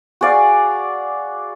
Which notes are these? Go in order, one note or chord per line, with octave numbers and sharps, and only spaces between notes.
F#4 G#4 D5 F5